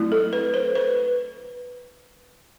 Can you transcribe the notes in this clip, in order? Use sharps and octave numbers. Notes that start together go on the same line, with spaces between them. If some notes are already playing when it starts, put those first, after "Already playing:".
Already playing: F#3 A3 C4 E4
A4
B4
C5
B4